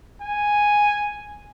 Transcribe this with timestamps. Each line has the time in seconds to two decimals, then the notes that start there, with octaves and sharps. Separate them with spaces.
0.22 G#5